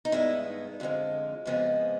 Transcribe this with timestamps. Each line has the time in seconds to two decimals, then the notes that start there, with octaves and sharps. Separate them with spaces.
0.05 D#4
0.12 G2 D#3 G#3 B3 E4
0.80 F2 D3 F3 G#3
1.46 F2 C#3 F3 G#3 B3